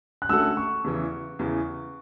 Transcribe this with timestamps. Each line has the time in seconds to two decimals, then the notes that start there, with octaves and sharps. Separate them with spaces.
0.22 F#6
0.29 D3 A3 C#4 F#4 A4 E6
0.57 C#6
0.84 E2 C#3 E3
1.39 E2 C#3 E3